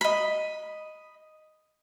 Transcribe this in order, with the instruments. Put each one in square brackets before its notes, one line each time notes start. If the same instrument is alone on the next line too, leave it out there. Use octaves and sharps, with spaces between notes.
[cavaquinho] D#5 B5